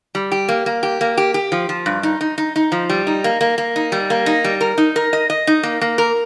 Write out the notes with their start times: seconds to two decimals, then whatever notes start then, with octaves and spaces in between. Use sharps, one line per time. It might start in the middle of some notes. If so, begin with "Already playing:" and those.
0.15 G3
0.32 G4
0.49 A#3
0.66 A#3
0.83 G4
1.01 A#3
1.17 G4
1.34 G4
1.52 F3
1.69 F3
1.86 G2
2.03 D#4
2.21 D#4
2.38 D#4
2.56 D#4
2.72 F3
2.90 G3
3.07 D#4
3.24 A#3
3.41 A#3
3.58 A#3
3.76 D#4
3.92 G3
4.10 A#3
4.26 D#4
4.44 G3
4.61 A#4
4.78 D#4
4.96 A#4
5.13 D#5
5.30 D#5
5.47 D#4
5.63 A#3
5.81 A#3
5.98 A#4